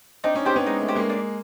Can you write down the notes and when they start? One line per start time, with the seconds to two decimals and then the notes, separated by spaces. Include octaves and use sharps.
0.24 C4 D4 D#4
0.35 C#4 D#4
0.46 C4 D4 G4 C5
0.56 B3 C#4
0.66 G#3 D#4
0.82 A3
0.89 G4 C5
0.95 G#3 A#3
1.10 D4